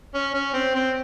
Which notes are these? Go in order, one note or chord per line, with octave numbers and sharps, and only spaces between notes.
C#4
C#4
C4
C4